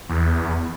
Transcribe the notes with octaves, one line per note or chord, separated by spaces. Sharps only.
E2